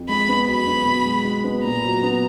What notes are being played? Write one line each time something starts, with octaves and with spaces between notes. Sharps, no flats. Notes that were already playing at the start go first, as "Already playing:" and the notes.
Already playing: F2
G#3 B5
B3
F#2 B5
B3
B2
G#3
G#3
B3
A#2 A#5
F#3
B3